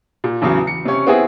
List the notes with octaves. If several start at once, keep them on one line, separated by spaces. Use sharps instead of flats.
A#2
A1 E2 C#3 F#3
C#7
C3 C#4
B3 C4 E4 G#4